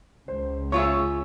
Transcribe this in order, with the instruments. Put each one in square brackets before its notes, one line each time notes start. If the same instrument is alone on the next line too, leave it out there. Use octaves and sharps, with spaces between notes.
[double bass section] C#2 [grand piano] C5
[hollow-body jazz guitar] C#4 F4 G#4 [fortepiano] C#5 E5 [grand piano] C#6 E6